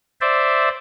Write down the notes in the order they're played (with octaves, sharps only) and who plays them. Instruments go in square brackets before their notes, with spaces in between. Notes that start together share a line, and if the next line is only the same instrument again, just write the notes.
[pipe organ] C5 D5 E5